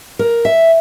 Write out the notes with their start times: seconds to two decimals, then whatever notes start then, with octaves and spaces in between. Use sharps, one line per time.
0.19 A#4
0.45 E5